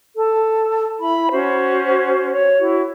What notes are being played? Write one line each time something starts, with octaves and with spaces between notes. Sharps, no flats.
A4
E4 B5
C#4 F#4 C5
C#5
E4 F#4